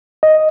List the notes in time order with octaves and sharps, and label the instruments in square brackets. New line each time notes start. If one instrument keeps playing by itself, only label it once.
[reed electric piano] D#5